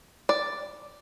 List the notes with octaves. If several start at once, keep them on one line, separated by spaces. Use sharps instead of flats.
D5